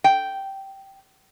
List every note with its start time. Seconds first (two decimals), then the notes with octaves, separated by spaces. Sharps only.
0.04 G5